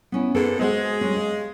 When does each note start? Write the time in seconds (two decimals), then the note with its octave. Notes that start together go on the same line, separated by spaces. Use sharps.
0.12 B3 C#4 E4
0.34 G#2 A#3 B3 G#4 A4 G5
0.59 G#3 F#4 C5 F#5
1.01 G3 C4 C#4
1.16 F5